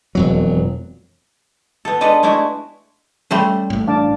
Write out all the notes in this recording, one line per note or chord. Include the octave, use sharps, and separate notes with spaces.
E1 F2 F#3
B3 A4
G#3 D4 A4 B4 D#5
G#3 A3 D4 E4 F#4
G3 A3 C#4 A4 C5
A1 A2
D4 F5 A5 D6